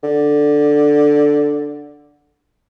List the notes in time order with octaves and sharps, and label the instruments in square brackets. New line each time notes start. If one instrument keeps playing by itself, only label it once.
[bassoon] D3